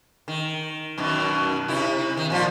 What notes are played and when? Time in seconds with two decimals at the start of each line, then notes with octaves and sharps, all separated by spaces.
0.28 D#3
0.98 F#2 B2 D#3
1.68 C3 D#4 E4
2.17 D#3
2.30 A#2 F3 F4